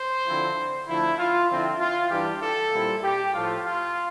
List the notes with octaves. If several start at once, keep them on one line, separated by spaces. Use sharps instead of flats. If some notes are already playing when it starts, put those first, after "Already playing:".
Already playing: C5
D3 F3 C4 E4
D3 F3 A3 E4
F4
D3 F3 C4 E4
F4
G2 E3 G3 D4 G4
A4
A#2 G3 C4 E4
G4
A2 F3 A3 F4
F4